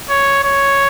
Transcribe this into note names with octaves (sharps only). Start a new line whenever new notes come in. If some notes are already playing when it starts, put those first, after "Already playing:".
C#5
C#5